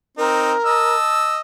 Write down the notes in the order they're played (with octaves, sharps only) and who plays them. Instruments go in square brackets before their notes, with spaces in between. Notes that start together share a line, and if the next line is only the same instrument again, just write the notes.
[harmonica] C4 D#4 [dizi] A#4
[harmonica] D#5 A5 E6